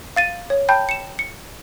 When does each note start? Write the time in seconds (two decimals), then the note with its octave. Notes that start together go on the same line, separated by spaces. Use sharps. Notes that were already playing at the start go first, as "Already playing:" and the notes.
0.16 F5 A6 D#7
0.50 C#5
0.69 G5 A5 B5 G6
0.89 C#7 E7
1.19 C#7